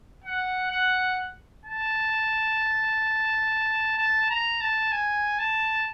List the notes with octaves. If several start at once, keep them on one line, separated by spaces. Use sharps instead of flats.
F#5
F#5
A5
A5
A#5
A5
G#5
A5